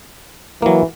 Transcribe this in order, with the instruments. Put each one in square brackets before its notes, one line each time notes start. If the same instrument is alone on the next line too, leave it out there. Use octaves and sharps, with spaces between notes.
[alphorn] E3 [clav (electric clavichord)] F#3 A#3